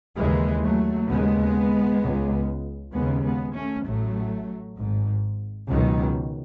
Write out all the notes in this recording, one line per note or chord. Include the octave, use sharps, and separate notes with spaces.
D#2 C#3 E3 G#3
F#3 A3
D#2 C#3 G#3 B3
C#2 C#3
D#2 C#3 G#3 B3
G#3 B3
A3 C#4
A1 A2 F#3 A3
G#1 G#2
C#2 B2 D#3 F#3